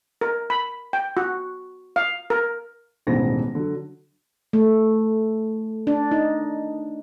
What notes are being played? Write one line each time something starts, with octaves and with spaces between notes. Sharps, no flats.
A#4
B5
G5
F#4
F5
A#4
E1 A1 E2 D#3 C5 A#6
D3 F#3
A3
D4
D#4